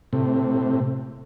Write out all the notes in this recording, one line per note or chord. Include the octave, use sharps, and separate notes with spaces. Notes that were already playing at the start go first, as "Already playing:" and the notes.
A2 C3